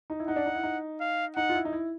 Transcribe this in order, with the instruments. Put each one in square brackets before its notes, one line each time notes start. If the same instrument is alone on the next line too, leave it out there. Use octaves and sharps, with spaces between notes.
[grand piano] D#4
E4
[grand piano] D#4 [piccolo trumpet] F#5
[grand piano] D4
D#4
E4
D#4
[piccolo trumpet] F5
[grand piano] D#4 [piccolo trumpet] F#5
[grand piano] F4
E4
D#4
E4